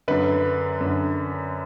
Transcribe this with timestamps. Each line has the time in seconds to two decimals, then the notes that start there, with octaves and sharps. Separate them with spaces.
0.08 F#2 D3 B4
0.81 F#2 D3